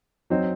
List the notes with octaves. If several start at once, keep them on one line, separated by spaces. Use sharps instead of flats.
F#3 C4 D#4